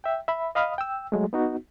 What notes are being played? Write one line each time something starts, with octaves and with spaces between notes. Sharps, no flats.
E5 G5
E5 B5
D#5 F5 B5 D#6 F6
G5 E6
F#3 G#3 A3
B3 D#4 F#4